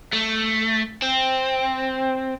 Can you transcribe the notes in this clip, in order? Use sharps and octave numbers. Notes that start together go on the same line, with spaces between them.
A3
C4